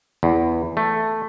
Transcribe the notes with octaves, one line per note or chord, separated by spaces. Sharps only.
E2
A3